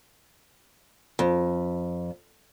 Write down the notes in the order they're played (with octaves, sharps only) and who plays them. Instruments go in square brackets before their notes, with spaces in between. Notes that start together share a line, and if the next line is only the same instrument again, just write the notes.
[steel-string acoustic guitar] F2